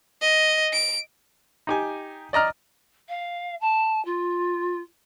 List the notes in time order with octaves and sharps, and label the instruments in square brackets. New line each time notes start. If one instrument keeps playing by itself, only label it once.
[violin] D#5
D7
[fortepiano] D#4 G4 G#5
D5 D#5 A#5 F6
[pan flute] F5
A5
F4